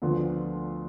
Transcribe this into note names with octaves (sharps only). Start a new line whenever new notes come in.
D2 D3 F3 B3 F4